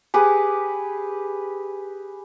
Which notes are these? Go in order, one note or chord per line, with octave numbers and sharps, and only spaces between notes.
G4 G#4 B4 G#5